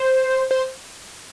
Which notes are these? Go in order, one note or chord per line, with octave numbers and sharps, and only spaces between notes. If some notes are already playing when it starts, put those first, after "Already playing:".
Already playing: C5
C5